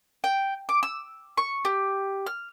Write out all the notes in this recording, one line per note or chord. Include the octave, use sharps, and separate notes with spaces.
G5
D6
E6
C#6
G4
F6